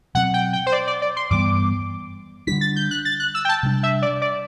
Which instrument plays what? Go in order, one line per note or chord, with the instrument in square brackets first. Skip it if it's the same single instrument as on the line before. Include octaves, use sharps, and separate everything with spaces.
[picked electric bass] B2 F#3 C4 [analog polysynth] F#5
[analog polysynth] G5
G5
C5
D5
D5
D5
C6
[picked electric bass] G2 E3 G3 B3 [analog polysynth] D6
[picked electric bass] D3 G3 D4 [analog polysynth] B6
[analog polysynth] A6
G6
F#6
A6
F#6
E6
G5
A5
[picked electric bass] C3 G3 D4
[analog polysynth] E5
D5
D5